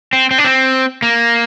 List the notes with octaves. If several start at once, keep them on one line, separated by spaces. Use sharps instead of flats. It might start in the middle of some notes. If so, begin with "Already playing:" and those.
C4
C4
D4
C4
A#3